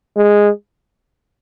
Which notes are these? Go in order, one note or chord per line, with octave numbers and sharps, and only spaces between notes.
G#3